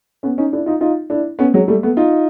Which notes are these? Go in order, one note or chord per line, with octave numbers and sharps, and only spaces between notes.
B3 C#4
C#4 D#4
D4 E4
D#4 F4
D#4 F4
D4 E4
B3 C#4
F#3 G#3
G3 A3
A3 B3
D#4 F4